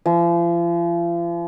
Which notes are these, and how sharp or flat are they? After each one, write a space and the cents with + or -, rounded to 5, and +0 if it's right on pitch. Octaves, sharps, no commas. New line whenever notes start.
F3 -40